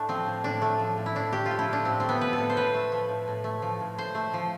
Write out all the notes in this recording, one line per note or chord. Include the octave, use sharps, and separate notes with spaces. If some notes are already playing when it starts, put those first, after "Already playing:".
Already playing: A2 A3 D4
F3 C4
A2
A2 D4
A3
F3
A2
E4
A2 D4
A3 G4
F4
F3
E4
A2
D4
A2 C4
A3 C4
B3
F3 B4
A4
A2
C5
A2 B4
A3
F3
A2
A2
A3
F3
A2
A2 C5
A3
F3